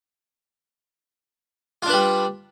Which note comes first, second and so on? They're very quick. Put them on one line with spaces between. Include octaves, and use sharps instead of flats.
F4 D4 B4 G3